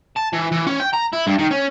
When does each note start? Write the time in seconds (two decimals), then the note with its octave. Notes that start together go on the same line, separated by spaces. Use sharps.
0.16 A5
0.33 E3
0.52 E3
0.66 C#4
0.80 G5
0.93 A#5
1.13 E4
1.27 G2
1.39 D#3
1.51 C#4